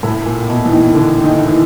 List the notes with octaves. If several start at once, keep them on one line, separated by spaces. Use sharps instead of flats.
A2
A#2
B2
E3
D#3
D3
D#3
E3